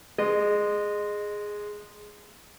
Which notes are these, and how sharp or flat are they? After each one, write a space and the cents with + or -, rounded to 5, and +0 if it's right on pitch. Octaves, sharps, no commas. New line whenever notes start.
G#3 +0 D#5 -25